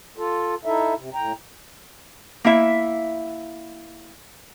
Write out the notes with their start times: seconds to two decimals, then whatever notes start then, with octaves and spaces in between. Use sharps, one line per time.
0.18 F4 A4
0.65 D#4 E4 A4 E5
0.96 C3
1.14 A2 G5 A#5
2.44 A#3 E4 E5